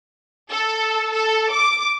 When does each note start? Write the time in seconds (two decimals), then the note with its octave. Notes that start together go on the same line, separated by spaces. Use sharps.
0.50 A4
1.12 A4
1.52 D6